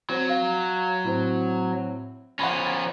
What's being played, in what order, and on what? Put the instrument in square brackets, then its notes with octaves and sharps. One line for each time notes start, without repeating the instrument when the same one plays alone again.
[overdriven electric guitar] F#3 [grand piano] C4
[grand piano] F5
A2 C4
[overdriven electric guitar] F3 C#4 [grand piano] F#5 B5